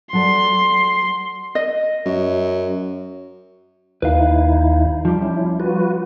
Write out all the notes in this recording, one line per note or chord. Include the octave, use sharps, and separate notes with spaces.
F#3 A4 D5 C6
D#5
F#2
D#2 D#4 E4 B4 F5
F3 G3 D#4
C#4 E4
F4 F#4 B4